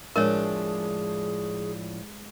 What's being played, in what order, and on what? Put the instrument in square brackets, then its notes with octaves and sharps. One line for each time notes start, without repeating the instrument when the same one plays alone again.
[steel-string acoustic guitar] A2 F3 D4 [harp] G#3 [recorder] G#4 [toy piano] A#4 C#5